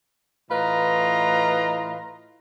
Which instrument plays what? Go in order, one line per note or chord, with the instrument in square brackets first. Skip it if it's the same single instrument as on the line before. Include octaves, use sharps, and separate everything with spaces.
[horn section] A2 E3 F4 B4 D#5 A#5